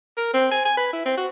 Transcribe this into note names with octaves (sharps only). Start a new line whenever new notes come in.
A#4
C4
G#5
G#5
B4
E4
C4
F#4